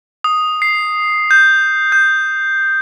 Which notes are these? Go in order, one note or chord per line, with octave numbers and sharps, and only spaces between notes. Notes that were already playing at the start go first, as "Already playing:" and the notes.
D#6
C7
G6
G6